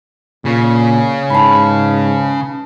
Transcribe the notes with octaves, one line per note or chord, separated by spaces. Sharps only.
A#2 C#3
G#2 B4 A5